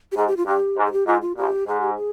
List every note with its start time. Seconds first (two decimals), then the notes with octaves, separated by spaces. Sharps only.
0.12 G4
0.17 G#2 G#4
0.27 G4
0.37 F4
0.47 G2 G4
0.77 G#2
0.85 G#4
0.92 G4
1.07 G#2 F4
1.22 F4
1.37 A#1 A#2 G4
1.67 G#2 G#4
1.81 G4
1.95 G#4